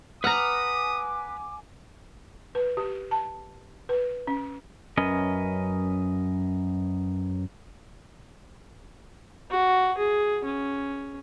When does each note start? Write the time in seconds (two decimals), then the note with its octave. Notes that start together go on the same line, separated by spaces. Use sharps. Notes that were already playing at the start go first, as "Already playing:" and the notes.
0.24 B4 F#5 G#5 A#5 D6 D#6 F6
2.55 B4
2.77 G4
3.11 A5
3.89 B4
4.27 C#4
4.97 F#2 C#4 A#4 B4 D#5
9.51 F#4
9.98 G#4
10.45 C#4